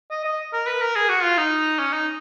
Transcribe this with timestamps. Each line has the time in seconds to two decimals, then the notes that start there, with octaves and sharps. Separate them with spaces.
0.11 D#5
0.25 D#5
0.53 A#4
0.67 B4
0.82 A#4
0.96 G#4
1.09 F#4
1.24 F4
1.38 D#4
1.79 C#4
1.93 D#4